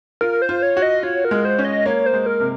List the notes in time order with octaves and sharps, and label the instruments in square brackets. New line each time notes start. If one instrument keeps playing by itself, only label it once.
[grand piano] F4 [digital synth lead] A#4
[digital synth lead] C5
[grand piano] F4
[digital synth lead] C#5
[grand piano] F#4
[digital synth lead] D#5
[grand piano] F4 [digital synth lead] C#5
[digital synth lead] A#4
[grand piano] G#3
[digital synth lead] C5
[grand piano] C#4
[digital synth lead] D#5
[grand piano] A#3 [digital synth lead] C#5
[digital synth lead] C5
[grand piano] G#3
[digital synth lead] A#4
[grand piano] C3